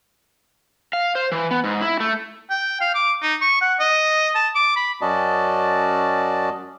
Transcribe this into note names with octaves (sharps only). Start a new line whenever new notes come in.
F5
C5
E3
B3
G#2
E4
A3
G5
F5
D6
D#4
C#6
F#5
D#5
A5
D6
B5
F#2 C#4 F#4 D5 D#5 A5